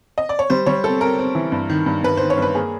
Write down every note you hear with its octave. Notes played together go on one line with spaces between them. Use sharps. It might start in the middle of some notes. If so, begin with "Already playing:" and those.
D#5
D5
C#5
G3 C5
G3 C#5
C4 A4
C4 A#4
C4
E3
G2
D#3
G2
G2 B4
D#3 C5
C#5
G2 B4
A#3 G#4